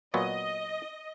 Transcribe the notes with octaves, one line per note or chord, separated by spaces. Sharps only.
A#2 F#3 B3 D#5